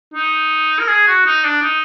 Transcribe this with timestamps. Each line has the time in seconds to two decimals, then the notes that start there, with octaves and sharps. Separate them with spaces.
0.14 D#4
0.79 A#4
0.88 G#4
1.07 F#4
1.26 D#4
1.44 D4
1.63 D#4